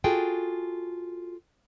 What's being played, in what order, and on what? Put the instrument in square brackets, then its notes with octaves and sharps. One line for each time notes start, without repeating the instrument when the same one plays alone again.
[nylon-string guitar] F4 F#4 G#4 A4 G5